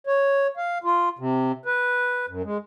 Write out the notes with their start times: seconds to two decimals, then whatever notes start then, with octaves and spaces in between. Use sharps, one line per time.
0.07 C#5
0.57 F5
0.84 F4
1.19 C3
1.66 B4
2.29 F#2
2.45 G#3